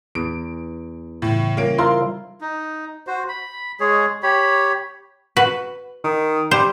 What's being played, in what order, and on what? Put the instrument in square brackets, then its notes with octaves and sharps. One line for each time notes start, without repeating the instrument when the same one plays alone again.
[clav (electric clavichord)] E2 [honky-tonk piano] D7
[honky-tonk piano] A2 [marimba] C#3 E3
[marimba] G3 F4 [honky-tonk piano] A#3 C#4 D7
[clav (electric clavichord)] E4 F4 A#4 [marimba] C5 [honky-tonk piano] C6
[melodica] D#4
F#4 C5
B5
G#3 G#4 C#5
G4 C#5 B5
[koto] F#4 B4
[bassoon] D#3
[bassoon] G3 [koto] C5